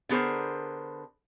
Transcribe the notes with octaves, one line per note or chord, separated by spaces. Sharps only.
D3 B3 G#4 A#4 C5